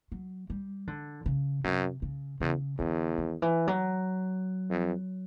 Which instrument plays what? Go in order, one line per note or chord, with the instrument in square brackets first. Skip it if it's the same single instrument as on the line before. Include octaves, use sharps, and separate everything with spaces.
[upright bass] F#3
G3
D3
C#3
[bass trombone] F#2 [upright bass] C3
[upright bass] C#3
[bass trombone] E2 [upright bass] C#3
[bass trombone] E2 [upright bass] D3
[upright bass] D#3
E3
F#3
[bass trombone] F2